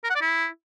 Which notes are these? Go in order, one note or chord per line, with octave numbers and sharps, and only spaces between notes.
A#4
F#5
D5
E4